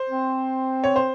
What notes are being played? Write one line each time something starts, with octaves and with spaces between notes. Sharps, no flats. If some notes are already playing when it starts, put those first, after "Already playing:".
Already playing: C5
C4
C#5
C5